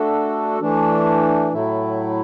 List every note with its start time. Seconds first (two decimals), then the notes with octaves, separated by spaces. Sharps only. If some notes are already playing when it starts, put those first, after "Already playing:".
Already playing: A3 D4 F#4 A4
0.60 E3 A3 D4
1.52 A2 F#3 A3 E4